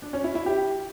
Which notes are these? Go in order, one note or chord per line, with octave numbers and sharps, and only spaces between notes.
D4
C#4
E4
E4
G4